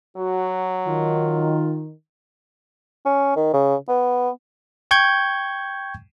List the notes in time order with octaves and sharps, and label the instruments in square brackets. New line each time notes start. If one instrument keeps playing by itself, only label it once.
[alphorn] F#3 [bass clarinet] F#4
[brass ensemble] D#3 [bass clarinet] F4
[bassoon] C#4
D#3
C#3
B3
[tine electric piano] G5 C#6 G6 G#6